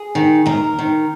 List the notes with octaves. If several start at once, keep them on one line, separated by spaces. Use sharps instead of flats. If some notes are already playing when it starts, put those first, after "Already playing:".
Already playing: G#4
D#3
D#2 A#4
D#3